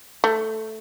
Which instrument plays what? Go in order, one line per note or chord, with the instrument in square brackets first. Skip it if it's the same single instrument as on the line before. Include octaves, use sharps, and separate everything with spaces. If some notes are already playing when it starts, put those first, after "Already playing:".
[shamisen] A3